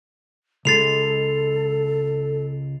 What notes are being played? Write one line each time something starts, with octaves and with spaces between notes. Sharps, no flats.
C#2 G#3 A4 A6 C7 F7